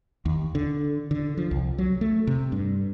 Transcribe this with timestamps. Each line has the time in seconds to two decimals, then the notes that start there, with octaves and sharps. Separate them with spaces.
0.25 D#2
0.55 D3
1.11 D3
1.37 F3
1.51 C2
1.78 F#3
2.01 A3
2.27 C3
2.52 G2